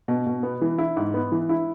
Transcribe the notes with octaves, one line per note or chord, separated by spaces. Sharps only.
B2
B2
B3
E3
E4
G#2
B3
E3
E4